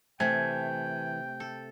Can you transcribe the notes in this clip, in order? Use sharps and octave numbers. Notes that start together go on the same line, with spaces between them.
C3 E3 A3 G5 G#5
A4